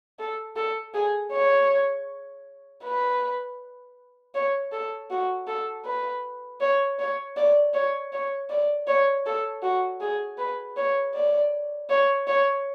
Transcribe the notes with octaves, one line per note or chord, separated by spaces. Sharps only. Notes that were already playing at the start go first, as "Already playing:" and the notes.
A4
A4
G#4
C#5
B4
C#5
A4
F#4
A4
B4
C#5
C#5
D5
C#5
C#5
D5
C#5
A4
F#4
G#4
B4
C#5
D5
C#5
C#5